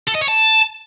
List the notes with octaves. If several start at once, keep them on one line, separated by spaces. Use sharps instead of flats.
A4
D#5
C#5
A5